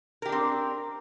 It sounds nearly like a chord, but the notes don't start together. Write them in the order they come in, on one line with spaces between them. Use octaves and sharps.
A#4 G4 D4 C4